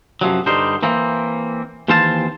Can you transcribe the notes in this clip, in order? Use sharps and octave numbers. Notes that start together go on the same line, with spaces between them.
F#2 C3 F3 F#3
G2 D3 G3 D#4 C5
E3 A#3 C4
D#2 E3 C4 C5 F5 A5